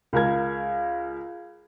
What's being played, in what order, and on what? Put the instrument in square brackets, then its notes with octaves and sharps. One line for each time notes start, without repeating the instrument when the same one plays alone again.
[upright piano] C#2 A#4 G#6